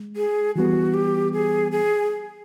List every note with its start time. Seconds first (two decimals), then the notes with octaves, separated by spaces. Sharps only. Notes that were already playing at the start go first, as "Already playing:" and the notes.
Already playing: G#3
0.16 G#4
0.56 E3 G3 B3 F#4
0.94 G4
1.33 G#4
1.72 G#4